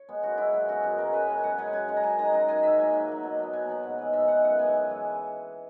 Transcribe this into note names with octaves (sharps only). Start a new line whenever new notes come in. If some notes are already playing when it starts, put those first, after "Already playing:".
Already playing: C#5
G#3 B3
F#2 F#4
C#3 G#3 E4
F#2 E4
C#3 G#3 F#4
F#2 G#4
C#3 G#3 A#4
F#2 B4
C#3 G#3
G#5
F#2 F#5
C#3 G#3 G#5
F#2 G#5
C#3 G#3
A#5
F#2 G#5
D#3 G#3 A#5
F#2 A#5
D#3 G#3 G#5
G#2 E5
F#3 A#3 G#5
G#2 G#5
F#3 A#3
B2
F#3 B3
B2 G#5
F#3 B3 F#5
G#2
E3 G#3
G#2 E5
E3 G#3 F#5
F#2 F#5
E3 G#3 B3 G#5
F#2
E3 G#3